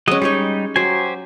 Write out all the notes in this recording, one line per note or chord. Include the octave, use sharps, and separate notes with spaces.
F#3 G#3 C#4 D#5
G3 G#3 D#4 G4 C#5
F#3 G4 C5 G#5